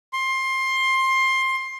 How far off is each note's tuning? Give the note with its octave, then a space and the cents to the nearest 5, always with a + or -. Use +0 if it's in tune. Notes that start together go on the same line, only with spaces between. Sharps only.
C6 +20